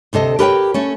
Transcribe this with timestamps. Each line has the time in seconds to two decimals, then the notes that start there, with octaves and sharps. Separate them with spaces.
0.13 D2 C3 A4 D#5
0.39 G4 A#4 B4 C#5 F#5 G5
0.74 A3 C#4